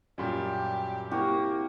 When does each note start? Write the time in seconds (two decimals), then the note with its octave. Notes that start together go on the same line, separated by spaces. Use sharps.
0.18 F#2 A#2 G3 G4
1.11 C2 A#3 F#4 G4